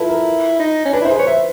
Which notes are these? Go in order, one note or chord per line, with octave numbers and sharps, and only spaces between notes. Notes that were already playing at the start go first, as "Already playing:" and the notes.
Already playing: E4 F4 A4 B4
A#4
D#4
C#4
D4 B4
E4 C5
G#4
B4
C#5
B4 E5